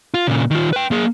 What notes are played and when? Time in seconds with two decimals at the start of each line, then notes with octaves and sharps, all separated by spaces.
0.14 F4
0.27 A#2 C#3
0.51 D#3 F4
0.73 B4 G5
0.91 A#3 G#4